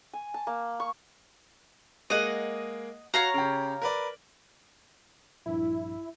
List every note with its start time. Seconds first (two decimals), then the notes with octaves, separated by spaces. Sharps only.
0.13 G#5
0.34 A5
0.47 A#3
0.80 C#6
2.10 G#3 A#3 D#5 F#5
3.14 F#4 C#5 F5 A#5
3.34 C#3 G4
3.82 A#4 B4 D5
5.46 A#1 G2 E4